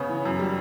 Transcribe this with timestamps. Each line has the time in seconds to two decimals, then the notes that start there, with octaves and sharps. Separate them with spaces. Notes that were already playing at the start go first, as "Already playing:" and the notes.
Already playing: C#3 B3 C#5
0.09 E3
0.25 F#2
0.39 G3